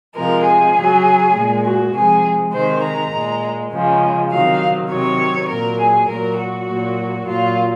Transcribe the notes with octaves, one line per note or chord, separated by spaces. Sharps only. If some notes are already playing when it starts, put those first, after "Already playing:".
C3 F3 G#3 A#4
G#4
C#3 F#3
A#2 G#3
F#4
C3 F3 G#3 G#4
C3 D#3 G#3 C5
A#5
A#2 G#3
C#3 F3 G#3
C3 D#3 F#3 F5
C3 D#3 F#3 C#5
A#2 F#3 A#4
G#4
A#2 F#3 A#4
F#4
A#2 F#3
A#2 F#3 F4